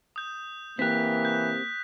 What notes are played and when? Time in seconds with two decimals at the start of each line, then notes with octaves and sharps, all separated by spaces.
0.16 D#6 G6
0.79 E3 A#3 C4 G4 F#6 B6
1.25 G6